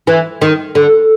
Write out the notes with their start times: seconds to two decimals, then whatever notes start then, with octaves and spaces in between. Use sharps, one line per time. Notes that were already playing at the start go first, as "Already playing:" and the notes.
0.07 E3
0.41 D#3
0.75 D3